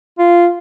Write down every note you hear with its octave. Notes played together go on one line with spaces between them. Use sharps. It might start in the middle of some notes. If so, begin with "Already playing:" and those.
F4